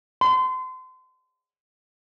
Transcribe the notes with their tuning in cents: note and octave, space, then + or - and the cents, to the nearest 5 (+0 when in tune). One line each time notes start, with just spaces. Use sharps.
C6 -35